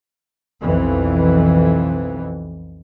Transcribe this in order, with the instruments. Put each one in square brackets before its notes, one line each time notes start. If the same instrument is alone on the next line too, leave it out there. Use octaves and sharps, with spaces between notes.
[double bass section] B1 F2 E3